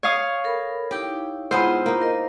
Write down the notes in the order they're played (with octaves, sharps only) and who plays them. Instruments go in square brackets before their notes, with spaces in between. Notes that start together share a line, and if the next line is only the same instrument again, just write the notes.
[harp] C#5 F5 D#6
[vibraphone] A4 A#4 B5
[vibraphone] D#4 E4 [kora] G4 G5
[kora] G#2 B3 G#4 [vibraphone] E4 F4 B5 [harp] C5
[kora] A#3 D#4
[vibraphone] A#4 D#5